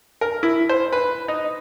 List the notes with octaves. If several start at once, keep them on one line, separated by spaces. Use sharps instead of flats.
A#4
E4
C5
B4
D#4